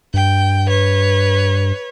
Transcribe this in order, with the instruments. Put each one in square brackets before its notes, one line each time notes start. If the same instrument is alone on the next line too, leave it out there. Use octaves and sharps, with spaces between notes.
[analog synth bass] G2 [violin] G5
[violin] B4 C#5